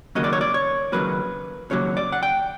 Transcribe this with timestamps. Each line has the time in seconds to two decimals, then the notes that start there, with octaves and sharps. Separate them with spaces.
0.15 D#2 C#3 F#3 A#3 D#5
0.24 D5
0.33 C#5
0.41 D5
0.54 C#5
0.92 D#2 C#3 F#3 A#3 B4
1.70 D#2 C#3 F#3 A#3 C#5
1.97 D5
2.12 F#5
2.23 G5